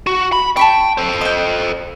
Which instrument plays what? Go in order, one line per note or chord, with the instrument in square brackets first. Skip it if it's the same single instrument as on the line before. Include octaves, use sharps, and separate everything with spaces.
[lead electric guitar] F#4
B5
[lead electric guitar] G5 [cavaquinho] A5 B5 C#6
[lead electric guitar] A4 C5
[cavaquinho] D#5 G5